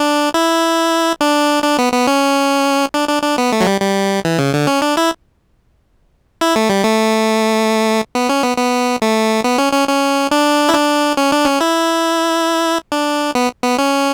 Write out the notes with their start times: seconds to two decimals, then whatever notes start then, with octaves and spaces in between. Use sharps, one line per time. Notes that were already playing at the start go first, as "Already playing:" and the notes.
Already playing: D4
0.34 E4
1.21 D4
1.64 D4
1.78 B3
1.93 B3
2.07 C#4
2.94 D4
3.09 D4
3.23 D4
3.38 B3
3.52 A3
3.60 F#3
3.67 G3
3.81 G3
4.25 E3
4.38 C#3
4.54 D3
4.67 C#4
4.82 D4
4.97 E4
6.41 E4
6.56 A3
6.70 G3
6.84 A3
8.15 B3
8.29 C#4
8.43 B3
8.57 B3
9.02 A3
9.44 B3
9.58 C#4
9.73 C#4
9.88 C#4
10.31 D4
10.69 E4
10.74 D4
11.17 C#4
11.32 D4
11.45 C#4
11.61 E4
12.92 D4
13.35 B3
13.63 B3
13.79 C#4